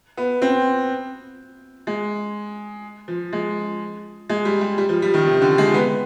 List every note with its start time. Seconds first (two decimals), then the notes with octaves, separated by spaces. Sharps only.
0.17 B3
0.42 C4
1.87 G#3
3.08 F3
3.33 G#3
4.30 G#3
4.45 G3
4.61 G3
4.78 G3
4.89 F3
5.02 G3
5.14 D#3
5.26 C3
5.41 D3
5.58 G#3
5.74 B3